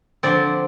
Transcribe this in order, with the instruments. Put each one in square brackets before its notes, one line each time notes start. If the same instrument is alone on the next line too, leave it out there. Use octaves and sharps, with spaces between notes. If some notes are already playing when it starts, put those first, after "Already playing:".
[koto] D3 F3 C4 D5